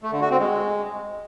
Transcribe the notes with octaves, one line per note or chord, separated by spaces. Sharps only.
A3
D3
F#4
C4
G#3